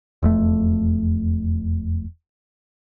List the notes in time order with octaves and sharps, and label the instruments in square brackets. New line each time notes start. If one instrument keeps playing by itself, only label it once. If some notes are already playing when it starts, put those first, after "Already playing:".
[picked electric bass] E1 F2 A3